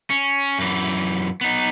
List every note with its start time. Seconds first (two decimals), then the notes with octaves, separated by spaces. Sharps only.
0.10 C#4
0.59 F#2 E3
1.41 B3 D#4